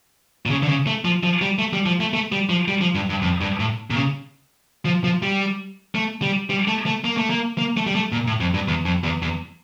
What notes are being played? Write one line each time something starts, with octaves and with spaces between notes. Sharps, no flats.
A#2
C#3
D3
C#3
A3
F3
F3
G3
A3
G3
F3
A3
A3
G3
F3
G3
F3
G2
G2
F2
G2
A2
A#2
C#3
F3
F3
G3
A3
G3
G3
A3
A3
A#3
A3
A#3
A#3
A3
G3
A3
A#2
A2
F2
G2
E2
F2
E2
E2